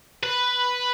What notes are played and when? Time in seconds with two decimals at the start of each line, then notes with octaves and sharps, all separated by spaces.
0.23 B4